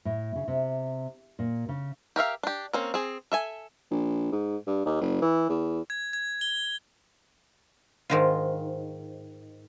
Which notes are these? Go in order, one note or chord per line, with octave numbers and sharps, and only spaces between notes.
A2
C#3
C3
A#2
C#3
G4 A#4 E5 F5
D4 G4
A#3 C4 C#4
C4 G#4
A4 E5 G#5
A#1
G#2
G2
D#2
F#1
E3
E2
G#6
G#6
G7
G#2 D#3 F4